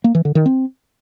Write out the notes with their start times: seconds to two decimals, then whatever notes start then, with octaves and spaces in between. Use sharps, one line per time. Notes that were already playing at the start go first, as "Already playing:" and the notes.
0.04 A#3
0.15 E3
0.25 D3
0.35 D#3
0.46 C4